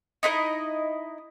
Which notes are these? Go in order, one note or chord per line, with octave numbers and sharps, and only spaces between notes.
D#4 E4 B4 D#5